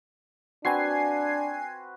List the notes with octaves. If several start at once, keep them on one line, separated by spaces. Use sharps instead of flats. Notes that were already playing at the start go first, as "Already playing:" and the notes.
C4 D4 F#4 B4 G#5 G#6 C7